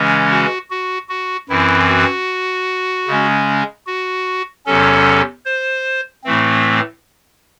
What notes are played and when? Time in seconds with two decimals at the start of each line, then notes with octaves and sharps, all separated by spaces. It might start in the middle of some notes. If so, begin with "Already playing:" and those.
Already playing: C#3 E3 G#3 C#4
0.31 F#4
0.71 F#4
1.09 F#4
1.49 F#2 E3 C4 E4
1.88 F#4
3.07 C#3 G#3 C#4
3.87 F#4
4.66 E2 C3 F#3 C#4 A4
5.46 C5
6.24 A2 E3 A3 C4